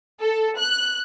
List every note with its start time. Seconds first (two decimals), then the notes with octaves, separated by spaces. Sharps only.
0.21 A4
0.59 F#6